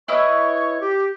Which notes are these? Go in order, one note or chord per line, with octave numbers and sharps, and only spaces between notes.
E4 B4 C#5 D#5 C#6
G4 D6